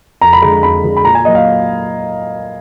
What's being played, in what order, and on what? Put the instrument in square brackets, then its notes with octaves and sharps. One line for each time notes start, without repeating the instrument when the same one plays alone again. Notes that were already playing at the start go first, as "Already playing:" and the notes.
[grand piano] F2 A#5
B5
D3 G#3 A#5
F2 B5
D3 G#3
B5
A#2 A#5
G#5
F#3 A#3 D#5
F5